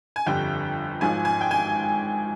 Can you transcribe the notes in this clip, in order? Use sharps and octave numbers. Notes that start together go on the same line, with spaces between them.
G#5
G1 F2 D3 G3 G5
G#1 G#2 F3 G#3 G#5
G#5
G5
G#5